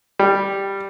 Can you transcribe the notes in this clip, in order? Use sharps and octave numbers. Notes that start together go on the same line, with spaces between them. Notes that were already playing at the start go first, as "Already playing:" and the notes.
G3